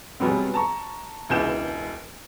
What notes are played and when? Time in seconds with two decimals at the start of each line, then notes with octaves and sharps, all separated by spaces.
0.20 E2 B2 F#3 G3 B3 C4
0.54 A5 A#5 C#6
1.29 E1 C#2 E3 G6 E7